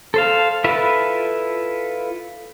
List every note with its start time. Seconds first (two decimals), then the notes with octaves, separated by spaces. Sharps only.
0.14 A4 C5 F5
0.64 E4 F4 A4 B4 E5